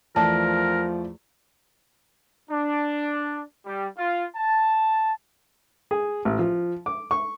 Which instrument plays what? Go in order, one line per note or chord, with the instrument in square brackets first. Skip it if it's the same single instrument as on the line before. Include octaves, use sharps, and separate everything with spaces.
[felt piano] E2 A3 D5 [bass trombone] F3 [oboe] A#4 [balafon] A5
[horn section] D4
G3
F4
A5
[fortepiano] G#4
A1
F3
D6
C#6